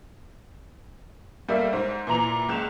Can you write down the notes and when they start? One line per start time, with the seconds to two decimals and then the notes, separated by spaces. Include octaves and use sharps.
1.49 G3 A3 A#3 D5 E5 F5
1.73 G#2 C5
2.07 A#2 E3 A#5 F7
2.49 F#1 C#2 F#6 E7 F7